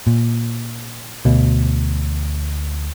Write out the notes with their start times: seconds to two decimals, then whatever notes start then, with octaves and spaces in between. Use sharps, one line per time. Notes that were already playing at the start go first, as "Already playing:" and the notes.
0.07 A#2
1.25 D2 B2